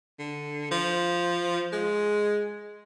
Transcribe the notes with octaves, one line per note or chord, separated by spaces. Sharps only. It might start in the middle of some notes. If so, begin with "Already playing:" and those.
D3
F3
G#3